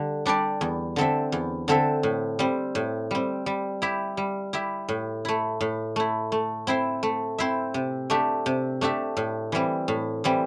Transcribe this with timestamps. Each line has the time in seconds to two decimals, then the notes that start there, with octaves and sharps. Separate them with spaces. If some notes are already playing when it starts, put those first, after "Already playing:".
Already playing: D3 G3 G4
0.26 G3 D4 G4 D5
0.61 E2
0.96 D3 C4 A4 E5
1.32 E2
1.68 D3 C4 A4 E5
2.03 A2
2.39 G3 C4
2.75 A2
3.11 G3 C4
3.46 G3
3.82 E4 G4 E5
4.17 G3
4.53 E4 G4 E5
4.89 A2
5.25 A3 E4
5.61 A2
5.96 A3 E4
6.32 A3
6.67 C4 E4 C5 E5
7.03 A3
7.38 C4 E4 C5 E5
7.74 C3
8.10 A3 D4 G4 E5
8.46 C3
8.81 A3 D4 G4 E5
9.17 A2
9.52 E3 G3 C4
9.88 A2
10.24 E3 G3 C4